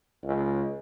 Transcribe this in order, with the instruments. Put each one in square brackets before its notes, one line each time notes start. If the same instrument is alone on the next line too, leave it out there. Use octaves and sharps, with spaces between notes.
[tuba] C#2